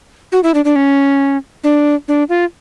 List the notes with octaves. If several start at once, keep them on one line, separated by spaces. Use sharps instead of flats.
F#4
E4
D4
D4
C#4
D4
D4
F4